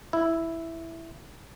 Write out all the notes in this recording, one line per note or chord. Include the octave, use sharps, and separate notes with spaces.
E4